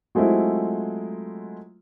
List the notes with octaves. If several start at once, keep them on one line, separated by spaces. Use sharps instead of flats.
F#3 G#3 A3 C4 E4 F4